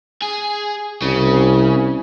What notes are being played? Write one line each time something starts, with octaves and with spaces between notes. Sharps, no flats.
G#4
C2 C#3